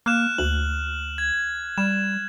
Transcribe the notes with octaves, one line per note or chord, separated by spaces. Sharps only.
A#3 F6 F#6 E7
D2 F#7
G#6
G3 E7